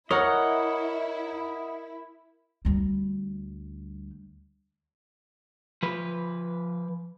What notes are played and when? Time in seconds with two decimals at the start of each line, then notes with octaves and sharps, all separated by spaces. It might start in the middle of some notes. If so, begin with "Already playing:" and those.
0.11 E4 A#4 C#5 D#5 F#5
2.65 D2 G3
5.83 F3 B4